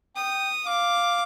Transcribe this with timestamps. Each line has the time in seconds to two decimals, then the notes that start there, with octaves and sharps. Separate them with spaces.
0.16 G5 D#6
0.66 F5 D6